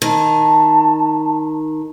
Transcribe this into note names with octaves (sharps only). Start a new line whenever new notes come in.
D#3 A5